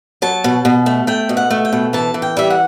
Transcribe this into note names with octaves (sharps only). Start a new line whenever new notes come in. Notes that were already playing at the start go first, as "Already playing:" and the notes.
F#3 A5
B2
B2
A3
A3 G5
B2
F#5
A3
G5
B2
E3 A5
E3
G5
G3 E5
F#5